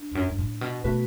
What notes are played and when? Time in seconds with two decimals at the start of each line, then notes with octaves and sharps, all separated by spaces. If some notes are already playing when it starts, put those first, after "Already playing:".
Already playing: D4
0.11 E2
0.15 F#2
0.30 F#2
0.38 A2
0.61 B2
0.84 B2 A3 F#4 B4